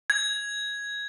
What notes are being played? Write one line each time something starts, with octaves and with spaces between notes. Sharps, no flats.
G#6